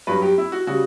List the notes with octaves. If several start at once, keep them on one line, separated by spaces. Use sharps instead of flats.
G2 F#3 B4
G4
E4
F#4
C#3 G3 F#4